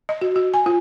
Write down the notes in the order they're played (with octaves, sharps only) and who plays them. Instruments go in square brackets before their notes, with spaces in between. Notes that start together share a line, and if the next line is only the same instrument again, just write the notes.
[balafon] D#5
F#4
F#4
G#5
F4